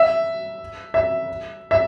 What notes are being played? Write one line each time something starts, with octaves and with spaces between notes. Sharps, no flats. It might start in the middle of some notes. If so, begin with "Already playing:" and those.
Already playing: E5
E5
E5